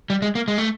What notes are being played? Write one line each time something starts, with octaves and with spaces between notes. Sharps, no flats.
G3
G#3
A#3
G#3
A3